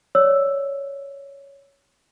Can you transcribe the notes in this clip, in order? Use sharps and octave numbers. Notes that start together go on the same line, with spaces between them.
C#5 D5 E6